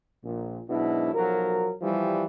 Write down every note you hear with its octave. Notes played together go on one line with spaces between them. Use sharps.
A#1 A#2
G#2 B2 F#3 D4 E4
B1 F3 F#3 A#4
E3 F3 G3